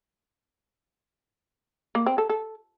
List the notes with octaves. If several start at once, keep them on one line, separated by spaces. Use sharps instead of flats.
A#3
C4
A4
A4